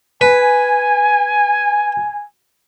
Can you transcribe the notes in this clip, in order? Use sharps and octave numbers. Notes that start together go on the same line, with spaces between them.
B4 G#5